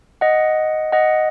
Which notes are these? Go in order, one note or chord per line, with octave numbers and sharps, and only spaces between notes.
D#5 F#5
D#5 F#5